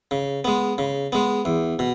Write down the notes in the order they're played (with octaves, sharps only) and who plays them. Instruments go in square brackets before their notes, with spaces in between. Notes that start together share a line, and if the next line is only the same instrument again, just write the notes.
[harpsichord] C#3
G#3 B3
C#3
G#3 B3
E2
B2